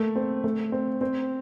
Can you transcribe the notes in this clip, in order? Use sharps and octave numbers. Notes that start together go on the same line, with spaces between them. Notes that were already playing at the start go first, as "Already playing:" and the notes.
Already playing: A3 A#3
C4
A3
C4
C4